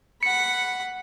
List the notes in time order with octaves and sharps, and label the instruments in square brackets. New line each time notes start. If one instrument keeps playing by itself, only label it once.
[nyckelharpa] F#5 B5 [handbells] C#7